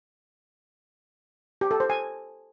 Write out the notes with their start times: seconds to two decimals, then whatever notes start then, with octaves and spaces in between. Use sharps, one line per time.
1.61 G4
1.71 A4
1.80 C5
1.90 G#5